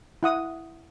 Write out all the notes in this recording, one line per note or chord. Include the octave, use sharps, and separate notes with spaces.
E4 F#5 D#6